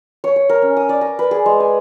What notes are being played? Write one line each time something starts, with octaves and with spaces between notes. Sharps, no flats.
C#5
C#5
A#4
C#4
D#6
D5
A#5
B4
G#4
G#3
G#5